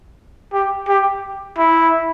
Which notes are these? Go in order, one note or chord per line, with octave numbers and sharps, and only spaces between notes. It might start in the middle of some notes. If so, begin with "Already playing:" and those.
G4
G4
E4